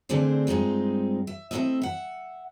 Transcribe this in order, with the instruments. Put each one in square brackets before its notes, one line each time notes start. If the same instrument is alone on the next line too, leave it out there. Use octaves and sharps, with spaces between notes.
[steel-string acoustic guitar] D3 A3 C4 D4 G#4 C5
G2 G#3 C4 D#4 F4
E5
A3 C4 D4 E4 D#5 E5
E5 F#5